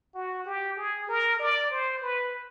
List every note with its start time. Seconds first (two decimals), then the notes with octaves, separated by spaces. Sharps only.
0.15 F#4
0.46 G4
0.77 G#4
1.09 A#4
1.40 D5
1.71 C5
2.02 B4